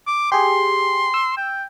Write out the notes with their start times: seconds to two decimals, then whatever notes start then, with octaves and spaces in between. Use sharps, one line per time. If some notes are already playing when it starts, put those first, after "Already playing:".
0.07 D6
0.32 G4 G#4 C6
1.14 E6
1.37 G5